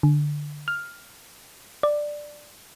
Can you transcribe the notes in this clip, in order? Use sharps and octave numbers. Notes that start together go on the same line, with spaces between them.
D3
F6
D5